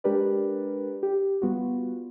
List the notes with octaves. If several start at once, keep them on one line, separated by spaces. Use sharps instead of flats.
G#3 D4 G4 A#4 B4 D5
G4
G3 B3 F4 F#4